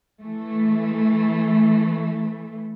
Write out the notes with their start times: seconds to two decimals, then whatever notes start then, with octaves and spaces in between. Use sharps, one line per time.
0.21 E3 A3